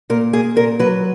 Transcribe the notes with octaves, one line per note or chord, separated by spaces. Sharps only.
A#2 A#4
A#3 G#4
A#2 A#4
F#3 B4